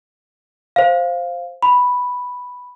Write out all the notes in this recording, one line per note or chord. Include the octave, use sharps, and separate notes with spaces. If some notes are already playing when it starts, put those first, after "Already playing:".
C5 F5
B5